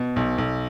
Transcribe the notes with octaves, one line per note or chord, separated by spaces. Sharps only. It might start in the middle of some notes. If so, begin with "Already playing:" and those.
Already playing: B2
B1
B1